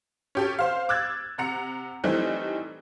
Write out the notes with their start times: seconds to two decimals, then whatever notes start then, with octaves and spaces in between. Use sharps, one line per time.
0.35 C#4 G4 A4
0.59 C5 F5
0.89 D6 E6 F#6 G#6 A6
1.38 C3 F#5 A#5 C#7
2.04 E3 G3 A3 C4 D#4